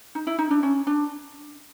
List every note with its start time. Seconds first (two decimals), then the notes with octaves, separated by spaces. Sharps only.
0.15 D#4
0.27 E4
0.39 D#4
0.50 D4
0.63 C#4
0.87 D4